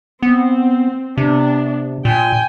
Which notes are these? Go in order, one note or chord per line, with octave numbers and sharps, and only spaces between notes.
B3 C4
C3 B3 D4
A#2 G5 G#5